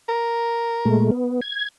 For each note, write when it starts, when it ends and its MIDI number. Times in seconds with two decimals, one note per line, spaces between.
0.08 1.14 70
0.85 1.11 46
0.85 1.11 56
0.85 1.11 57
1.11 1.41 59
1.41 1.68 92